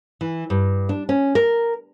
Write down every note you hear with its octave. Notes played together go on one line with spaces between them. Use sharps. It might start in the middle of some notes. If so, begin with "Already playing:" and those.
E3
G2
D4
C#4
A#4